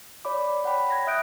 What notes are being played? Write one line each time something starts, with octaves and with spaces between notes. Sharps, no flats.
C#5 D5 B5 D6
C#5 F#5 G5 B5
G#6 A#6
E5 D#6 F#6 G6 D7